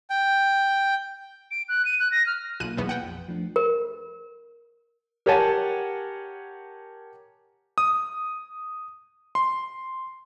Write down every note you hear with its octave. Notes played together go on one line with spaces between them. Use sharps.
G5
D7
F#6
D#7
F#6
A#6
F6
B1 A#3 F4 F#6 D#7
B1 E2 B3
F#5 G5
A#1 F2
F3 A3 D4
A#4
G4 A#4 C#5 F#5 G#5 A5
D#6
C6